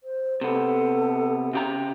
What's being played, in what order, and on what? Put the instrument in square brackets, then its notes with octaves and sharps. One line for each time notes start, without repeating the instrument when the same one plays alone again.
[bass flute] C5
[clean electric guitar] C3 B3 [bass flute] A4
[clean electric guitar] C#3 G4 A#5